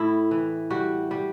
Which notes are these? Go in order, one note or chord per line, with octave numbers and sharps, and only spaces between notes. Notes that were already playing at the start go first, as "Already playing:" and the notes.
Already playing: A2 E4
E3
G3 F#4
G3